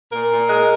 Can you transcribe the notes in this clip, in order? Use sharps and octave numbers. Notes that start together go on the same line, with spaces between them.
A#2 A#4
A#2
G#3